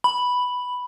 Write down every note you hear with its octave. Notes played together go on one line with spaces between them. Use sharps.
B5